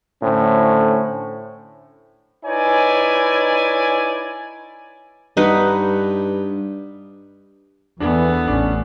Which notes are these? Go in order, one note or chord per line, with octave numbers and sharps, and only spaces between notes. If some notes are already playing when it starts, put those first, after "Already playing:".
A2 D3 C#4 C5
D#4 E4 B4 C#5 D5 G#5
G2 D#4 B4 F#5
E2 E3 B3 D4 A4
A1 C#4 D4